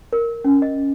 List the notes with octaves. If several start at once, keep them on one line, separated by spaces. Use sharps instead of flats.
A#4
C#4
D#5